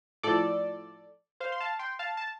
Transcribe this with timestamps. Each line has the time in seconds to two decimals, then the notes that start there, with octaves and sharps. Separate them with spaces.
0.23 A2 F3 A4 D5
1.40 C5 F5
1.52 C6
1.60 F5 A5
1.79 G5 C6
1.99 F5 A5
2.17 A5